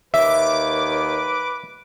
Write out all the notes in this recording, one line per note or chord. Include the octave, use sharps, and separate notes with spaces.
D#2 B4 E5 D6